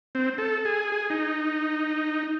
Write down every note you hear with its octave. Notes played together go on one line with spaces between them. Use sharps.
C4
A4
G#4
G#4
D#4